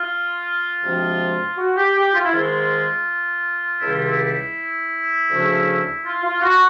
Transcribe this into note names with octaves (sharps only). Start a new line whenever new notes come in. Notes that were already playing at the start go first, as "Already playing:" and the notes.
Already playing: F4
D2 C3 F3 G#3 C4
F#4
G4
G4
F4
E4
G#2 D#3 G#3 F4
C#2 C3 D#3 G3 E4
F4
E4
D2 C#3 F3 A3 C#4
F4
F4
F#4